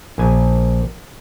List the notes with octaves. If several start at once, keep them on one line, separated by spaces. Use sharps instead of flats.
A#1 G#5